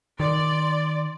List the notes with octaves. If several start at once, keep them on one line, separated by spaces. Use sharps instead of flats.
D#3 D5 C6